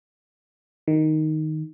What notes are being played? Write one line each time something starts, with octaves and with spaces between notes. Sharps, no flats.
D#3